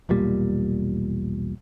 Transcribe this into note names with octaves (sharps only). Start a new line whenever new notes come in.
E1 B1 A#2 G3